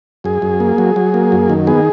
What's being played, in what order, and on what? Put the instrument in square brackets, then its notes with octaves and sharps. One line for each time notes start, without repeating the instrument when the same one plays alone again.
[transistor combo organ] F#2 G#4
F#2
A#3
F#3
F#3
A#3
F#2
D#3
B3 G#4